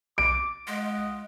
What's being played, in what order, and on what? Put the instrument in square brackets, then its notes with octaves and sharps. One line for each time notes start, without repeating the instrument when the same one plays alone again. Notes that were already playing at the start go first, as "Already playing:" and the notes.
[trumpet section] D6 [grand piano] D7
[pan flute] G#3 [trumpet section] F4 D#5 F#5